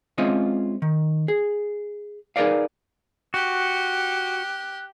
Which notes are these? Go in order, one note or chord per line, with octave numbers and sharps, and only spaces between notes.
G#3 C4 C#4 F4 D#5 E5
D#3
G#4
D#4 G#4 A#4 B4 D5 F5
F#4 G4 F#6